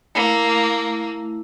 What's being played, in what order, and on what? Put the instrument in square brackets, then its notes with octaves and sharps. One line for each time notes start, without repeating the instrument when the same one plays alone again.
[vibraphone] A3 E4 [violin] A#3